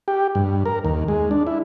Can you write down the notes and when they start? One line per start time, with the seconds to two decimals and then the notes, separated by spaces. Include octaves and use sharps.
0.08 G4
0.35 G2
0.66 A#4
0.85 D#2
1.08 G#3
1.31 D4
1.47 E4